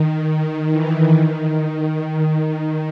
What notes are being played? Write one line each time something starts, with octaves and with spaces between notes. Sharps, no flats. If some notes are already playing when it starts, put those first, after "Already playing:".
Already playing: D#3
D#3
E3
D#3